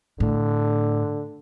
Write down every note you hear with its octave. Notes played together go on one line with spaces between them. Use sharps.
A2 D3